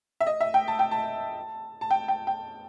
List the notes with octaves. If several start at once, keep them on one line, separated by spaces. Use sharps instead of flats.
E5
D#5
E5
G5
A5
G5
A5
A5
G5
G5
G5